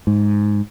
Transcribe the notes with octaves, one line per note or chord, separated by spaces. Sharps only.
G#2